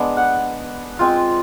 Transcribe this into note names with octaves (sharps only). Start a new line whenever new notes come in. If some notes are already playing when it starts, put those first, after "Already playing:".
Already playing: G#3 B3 D4
F#5
G#3 C4 F4